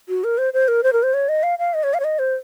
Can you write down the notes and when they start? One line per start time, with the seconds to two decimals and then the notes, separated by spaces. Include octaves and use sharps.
0.09 F#4
0.24 A#4
0.38 C5
0.54 C5
0.68 A#4
0.83 C5
0.93 A#4
1.03 C5
1.14 C#5
1.29 D#5
1.43 F5
1.59 F5
1.74 D#5
1.84 C#5
1.94 F5
2.00 C#5
2.04 D#5
2.19 C5